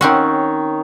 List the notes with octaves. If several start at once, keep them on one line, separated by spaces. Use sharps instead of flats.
D#3 C4 C#4 F#4 C#5